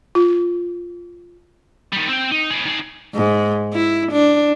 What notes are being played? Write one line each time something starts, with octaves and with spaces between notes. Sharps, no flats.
F4
D#3 G3
C4 G5
D#4
G#4 B4
D#3 G#4
G#2
E4
D4